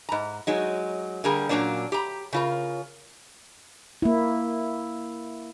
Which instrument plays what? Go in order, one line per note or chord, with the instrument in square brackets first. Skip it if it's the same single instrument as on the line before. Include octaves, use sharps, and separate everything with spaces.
[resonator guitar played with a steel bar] G#2 A#5
F#3 G#3 D#4
D3 G3 A#3 G#4 A#4
A#2 F#3 A#3 C#4 D4
G4 A#5
C#3 F4 A#4
[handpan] A#3 E4